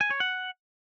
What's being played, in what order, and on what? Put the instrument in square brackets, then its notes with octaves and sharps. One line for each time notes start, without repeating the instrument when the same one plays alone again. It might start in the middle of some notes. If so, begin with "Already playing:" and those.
[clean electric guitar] G#5
C#5
F#5